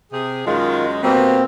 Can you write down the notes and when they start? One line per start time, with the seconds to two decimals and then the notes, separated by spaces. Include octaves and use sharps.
0.12 C3 G#4
0.46 F#2 D#3 G#3 F4
1.03 B2 G3 A#3 C4